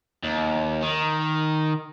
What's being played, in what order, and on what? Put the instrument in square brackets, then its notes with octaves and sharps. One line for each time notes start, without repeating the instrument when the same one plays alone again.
[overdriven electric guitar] D#2
D#3